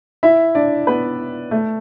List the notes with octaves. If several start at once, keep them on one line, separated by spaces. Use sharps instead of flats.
E4 E5
D4 D5
B3 B4
A3